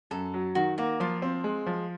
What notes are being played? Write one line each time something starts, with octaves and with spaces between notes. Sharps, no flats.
F#2 A4
F#3
D#3 F#4
A#3 F#4
F3 F4
C4
G#3
F3